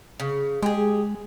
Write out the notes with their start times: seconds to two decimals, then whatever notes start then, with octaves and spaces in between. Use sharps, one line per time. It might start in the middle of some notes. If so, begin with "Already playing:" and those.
0.20 C#3
0.63 G#3 G4 G#4